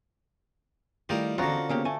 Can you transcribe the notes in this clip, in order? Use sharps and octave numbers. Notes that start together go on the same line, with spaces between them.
D#3 G3 A3 E4 F4 A#4 D#5 G5
E2 D3 C4 C#4 F4 F#4 A#4
C#3 A#3 B3 C#4 G4
A3 G#5